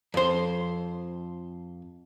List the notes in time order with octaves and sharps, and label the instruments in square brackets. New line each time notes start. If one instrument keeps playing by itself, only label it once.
[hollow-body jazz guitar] F2 C5